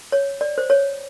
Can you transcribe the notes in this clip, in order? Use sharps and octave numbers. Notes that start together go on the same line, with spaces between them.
C#5
D5
C5
C#5